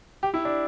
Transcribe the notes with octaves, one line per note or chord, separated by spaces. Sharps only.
G4
E4
D4